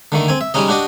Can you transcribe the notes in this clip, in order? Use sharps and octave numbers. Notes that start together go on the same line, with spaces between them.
D3 D#3 A3
C4 G#5
E5
G3 G#3 C#4 D#4 D#5
D4 F#4 G4 D#5